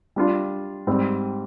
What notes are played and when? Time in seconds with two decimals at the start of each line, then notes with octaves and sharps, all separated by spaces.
0.16 G3 D4 F4
0.87 G#2 G3 C4